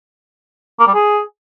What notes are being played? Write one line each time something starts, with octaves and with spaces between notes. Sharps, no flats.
A#3
G3
G#4